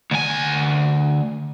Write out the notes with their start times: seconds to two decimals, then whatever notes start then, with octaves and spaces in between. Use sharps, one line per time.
0.11 D2 G#5